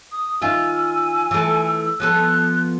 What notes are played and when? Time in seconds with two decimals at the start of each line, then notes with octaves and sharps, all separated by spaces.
0.12 D#6
0.42 D#3 F4 E5 G#5 E6
1.31 E3 A3
2.00 F3 B3 A4 F#6